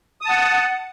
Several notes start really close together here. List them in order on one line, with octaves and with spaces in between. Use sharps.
D#6 A5 F#5